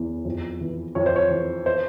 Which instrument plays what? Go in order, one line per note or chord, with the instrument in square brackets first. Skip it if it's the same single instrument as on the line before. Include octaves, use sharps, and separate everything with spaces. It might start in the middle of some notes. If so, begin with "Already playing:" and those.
Already playing: [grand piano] E2 E3
F2
E3
F2 C#5
C5
C#5
E3
C5